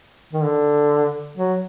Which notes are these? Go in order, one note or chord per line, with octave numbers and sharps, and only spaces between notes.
D#3
D3
F#3